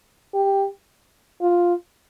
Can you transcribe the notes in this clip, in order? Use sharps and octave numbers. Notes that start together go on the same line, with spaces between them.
G4
F4